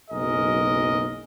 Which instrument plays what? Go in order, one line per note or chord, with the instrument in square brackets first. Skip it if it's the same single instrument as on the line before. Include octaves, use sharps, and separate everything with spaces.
[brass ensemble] F#1 B1 G#4 A#4 D#5